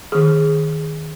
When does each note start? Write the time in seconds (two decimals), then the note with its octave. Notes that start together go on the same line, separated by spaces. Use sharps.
0.12 D#3 G#4